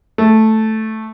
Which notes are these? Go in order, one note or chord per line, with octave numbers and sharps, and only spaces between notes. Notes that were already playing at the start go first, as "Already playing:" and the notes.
A3